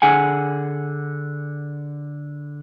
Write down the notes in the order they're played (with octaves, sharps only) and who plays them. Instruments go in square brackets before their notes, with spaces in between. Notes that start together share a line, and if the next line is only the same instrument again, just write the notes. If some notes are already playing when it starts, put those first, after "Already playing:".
[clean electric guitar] D3 G#4 F#5 G#5